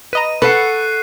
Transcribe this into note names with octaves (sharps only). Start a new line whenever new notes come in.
B4 D#5 A#5 D#7
A4 B4 F#5 C#6 F#6 C7